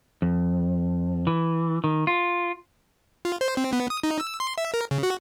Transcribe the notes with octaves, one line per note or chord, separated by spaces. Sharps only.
F2
E3
D#3
F4
F4
C5
C4
B3
D#6
D#4
E6
C6
E5
A#4
C#3
F#4